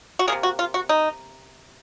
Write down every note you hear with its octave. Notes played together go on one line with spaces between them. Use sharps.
F#4
C3 D#3 A#3 G#4
F#4
F4
F#4
D#4